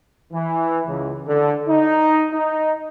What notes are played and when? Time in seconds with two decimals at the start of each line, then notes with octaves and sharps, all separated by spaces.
0.33 E3
0.87 C#2
1.27 D3
1.68 D#4
2.32 D#4